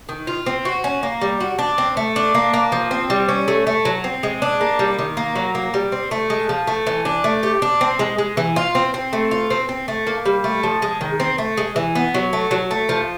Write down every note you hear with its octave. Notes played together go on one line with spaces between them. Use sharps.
D#3
F4
C4
F#4
C#4
A#3
G3
F#4
D4
C4
A3
D4
A#3
A#3
F3
C4
G3
C#4
A3
A3
F#3
C4
G#3
D4
A#3
G3
D#3
A#3
F#3
A#3
G3
C4
A3
G#3
F3
A3
E3
D4
A3
G4
D4
C4
G#3
G#3
E3
F4
C4
C4
A3
F4
C4
C4
A3
A#3
G3
A3
F3
G#3
D#3
C4
A3
G#3
E3
B3
F#3
A3
F#3
A3
F3